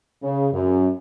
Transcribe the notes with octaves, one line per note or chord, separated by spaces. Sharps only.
C#3
F#2